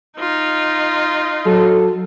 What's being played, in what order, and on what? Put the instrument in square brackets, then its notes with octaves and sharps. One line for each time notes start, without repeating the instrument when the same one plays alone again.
[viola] D#4 F4
[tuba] F#3 [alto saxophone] A4